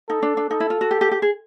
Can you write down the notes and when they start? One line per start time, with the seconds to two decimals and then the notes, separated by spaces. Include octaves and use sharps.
0.09 D#4 A4
0.22 D4
0.37 D4
0.50 D#4 A4
0.60 E4
0.70 F4
0.81 F#4
0.91 G4
1.01 G4
1.11 G4
1.22 G#4